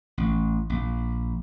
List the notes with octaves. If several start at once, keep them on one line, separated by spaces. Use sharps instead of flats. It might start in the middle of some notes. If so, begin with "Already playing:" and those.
A1
A#1